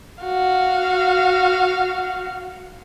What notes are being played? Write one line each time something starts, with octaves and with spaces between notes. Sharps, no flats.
F#4 F5